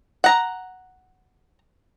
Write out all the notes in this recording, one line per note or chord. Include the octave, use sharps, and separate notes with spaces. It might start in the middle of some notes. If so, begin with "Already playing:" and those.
F#5 A#5